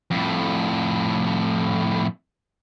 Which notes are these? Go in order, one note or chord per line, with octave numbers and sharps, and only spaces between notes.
F2 A2